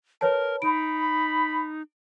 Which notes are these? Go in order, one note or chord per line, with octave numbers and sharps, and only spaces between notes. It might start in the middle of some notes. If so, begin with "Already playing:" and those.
A#4 B4 C#5 A5
D#4 B5 D7